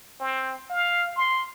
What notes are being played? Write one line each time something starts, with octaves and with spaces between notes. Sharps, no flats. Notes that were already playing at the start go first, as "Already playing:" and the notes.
C4
F5
C6